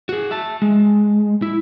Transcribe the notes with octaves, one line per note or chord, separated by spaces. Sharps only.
F#4 G#4
E5 A5
G#3
E4